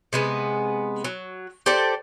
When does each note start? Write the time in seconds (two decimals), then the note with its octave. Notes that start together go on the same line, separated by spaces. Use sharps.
0.13 C3 G#3 B3
1.04 F#3
1.66 G4 A4 C5 D5